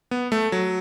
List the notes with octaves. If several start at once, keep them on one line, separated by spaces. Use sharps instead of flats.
B3
A3
F#3